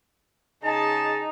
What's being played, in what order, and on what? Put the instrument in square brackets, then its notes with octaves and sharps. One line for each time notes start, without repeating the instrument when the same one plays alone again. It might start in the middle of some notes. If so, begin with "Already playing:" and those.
[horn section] C#3 G#4 A5 [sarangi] D#4